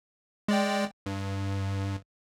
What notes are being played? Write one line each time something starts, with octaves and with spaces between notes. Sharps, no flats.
G#3 D5 G5
G2